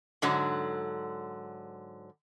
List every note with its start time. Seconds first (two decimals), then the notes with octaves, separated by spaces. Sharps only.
0.22 G#2 D3 F#3